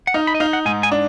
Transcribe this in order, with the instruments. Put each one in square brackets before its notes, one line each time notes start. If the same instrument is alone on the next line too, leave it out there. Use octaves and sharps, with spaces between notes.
[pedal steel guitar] F#5
[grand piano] D#4 [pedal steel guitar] F5
[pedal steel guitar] B5
D#5
[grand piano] D#4 [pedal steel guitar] F5
[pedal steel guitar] F#5
[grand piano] G#2 [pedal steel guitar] G#5
[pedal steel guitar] G#5
[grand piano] D4